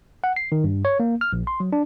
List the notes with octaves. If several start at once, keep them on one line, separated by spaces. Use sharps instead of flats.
F#5
C7
D#3
G2
C#5
A#3
F6
A#1
C6
F#3
D4